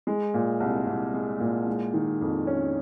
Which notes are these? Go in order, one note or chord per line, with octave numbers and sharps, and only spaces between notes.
G#3
A#2
C2
C2
G#3
A#2
G#3
D#3
F2
C#4